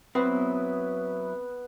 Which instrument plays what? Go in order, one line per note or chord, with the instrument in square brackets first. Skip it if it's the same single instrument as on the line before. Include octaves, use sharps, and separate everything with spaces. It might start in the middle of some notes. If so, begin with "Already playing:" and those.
[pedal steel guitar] F#3 E4 [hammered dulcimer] B3 [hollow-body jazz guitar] C4 [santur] B4